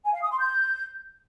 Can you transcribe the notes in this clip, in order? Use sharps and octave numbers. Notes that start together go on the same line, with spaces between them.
G#5
F5
D#6
C6
G6